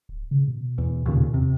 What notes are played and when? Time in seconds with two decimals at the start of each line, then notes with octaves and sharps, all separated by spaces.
0.09 D1
0.31 C#3
0.48 B2
0.78 E2
1.06 D#2 A#2 C#3
1.34 E2 C3